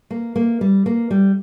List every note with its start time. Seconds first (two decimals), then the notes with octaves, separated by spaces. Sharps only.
0.11 A#3
0.36 A#3
0.61 G3
0.86 A#3
1.11 G3